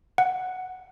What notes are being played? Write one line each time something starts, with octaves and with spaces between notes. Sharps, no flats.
F#5